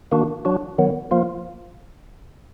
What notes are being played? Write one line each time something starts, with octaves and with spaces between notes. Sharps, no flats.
D#3 A#3 D4 F#4
F#3 D4 F#4
D#3 F#3 B3
F3 A#3 F4